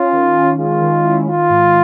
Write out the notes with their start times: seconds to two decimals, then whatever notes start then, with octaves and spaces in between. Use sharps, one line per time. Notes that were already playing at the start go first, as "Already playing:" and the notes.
Already playing: C#4 F4
0.12 D#3
0.35 C#4
0.57 G#3 F4
0.81 D#3
1.04 E4
1.27 D#3 F4
1.49 G#2